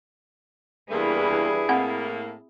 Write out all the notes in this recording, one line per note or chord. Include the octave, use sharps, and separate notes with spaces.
E2 G3 A#3 D4 E4 G#4 B4
A2 A#3 C4 F#5 B5